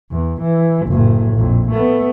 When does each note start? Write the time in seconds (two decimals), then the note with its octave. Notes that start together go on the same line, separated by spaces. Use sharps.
0.11 E2
0.41 E3
0.87 F#1 A2
1.34 A#1 F2
1.71 A3 B3